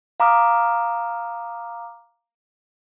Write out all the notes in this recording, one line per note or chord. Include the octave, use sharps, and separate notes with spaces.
F5 A#5 D6 D#6 F6